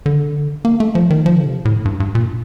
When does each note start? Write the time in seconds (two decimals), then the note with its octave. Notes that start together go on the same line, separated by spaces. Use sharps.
0.06 D3
0.65 A#3
0.80 A3
0.95 F3
1.10 D#3
1.26 F3
1.36 D3
1.46 C3
1.65 A2
1.85 G2
2.00 G2
2.15 A#2